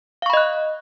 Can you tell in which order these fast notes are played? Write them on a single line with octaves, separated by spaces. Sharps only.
F5 C#6 B5 D#5 F#6